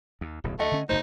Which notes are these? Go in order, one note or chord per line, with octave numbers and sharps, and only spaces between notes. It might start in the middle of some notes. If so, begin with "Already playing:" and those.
D#2
D1 B1 E2
D2 A3 D#5 F#5
D3 C#4
F1 C#2 A3 D#4 C5